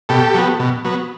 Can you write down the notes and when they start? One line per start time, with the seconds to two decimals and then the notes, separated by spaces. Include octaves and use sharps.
0.09 B2 G4 A4
0.34 F#3 B3
0.60 B2
0.85 F#3 B3